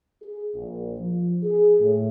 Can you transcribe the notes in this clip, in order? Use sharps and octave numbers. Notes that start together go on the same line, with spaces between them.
G#4
A#1
F3
G#4
A2